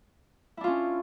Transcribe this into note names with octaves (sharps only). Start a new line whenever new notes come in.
C#4 D4 E4 F4